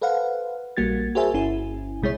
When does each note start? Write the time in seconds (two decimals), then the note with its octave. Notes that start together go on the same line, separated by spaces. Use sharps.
0.02 A4 B4 C5 F5 F#5
0.77 A#1 G3 A#3 F#4 G#6 A6
1.15 F#4 G#4 A#4 C5 E5 G#5
1.34 G1 C#4 E4 G#5
2.01 A#1 C3 G#3 E4 C#5